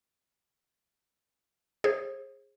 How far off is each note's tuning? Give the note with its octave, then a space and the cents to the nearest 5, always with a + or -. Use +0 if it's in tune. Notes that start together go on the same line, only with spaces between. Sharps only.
G#4 -10 C5 +40